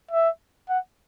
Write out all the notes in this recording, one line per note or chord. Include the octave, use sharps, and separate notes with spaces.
E5
F#5